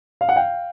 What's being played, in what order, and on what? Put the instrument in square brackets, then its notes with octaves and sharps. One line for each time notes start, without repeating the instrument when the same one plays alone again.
[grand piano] F5
F#5
F5 G5